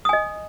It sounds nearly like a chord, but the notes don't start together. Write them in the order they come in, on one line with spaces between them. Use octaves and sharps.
D#6 G#5 D#5